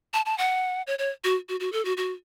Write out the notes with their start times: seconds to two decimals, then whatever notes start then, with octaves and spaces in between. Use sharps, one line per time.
0.13 A5
0.26 A5
0.38 F#5
0.87 C#5
0.99 C#5
1.24 F#4
1.49 F#4
1.60 F#4
1.72 A4
1.85 F#4
1.97 F#4